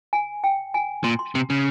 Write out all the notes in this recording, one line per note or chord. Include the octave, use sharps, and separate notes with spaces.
G#5
G5
G#5
A#2 C6
C6
C3
C#3